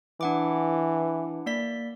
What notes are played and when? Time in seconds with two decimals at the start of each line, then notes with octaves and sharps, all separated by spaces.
0.21 E3 D4 F#5 D6
1.46 A#3 D5 B6